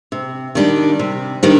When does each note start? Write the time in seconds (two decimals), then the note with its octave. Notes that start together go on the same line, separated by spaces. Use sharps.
0.12 C3
0.55 D#3 G3 D4
0.99 C3
1.43 D#3 G3 D4